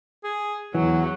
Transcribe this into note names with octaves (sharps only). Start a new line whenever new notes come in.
G#4
E2 E3 F#3